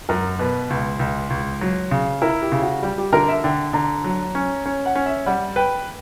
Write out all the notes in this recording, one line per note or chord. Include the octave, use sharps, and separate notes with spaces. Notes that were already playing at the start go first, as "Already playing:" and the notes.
F#2 A#4
B2 B4
C#2
C#2
C#2
F#3
C#3
E4 A#4
G4
C#3
F#4
G3 G4
G4
D3 A#4
E5
D3 G5
D3 A#5
F#3
C#4
C#4
F#5
C#4
E5
G3 F#5
B4 G5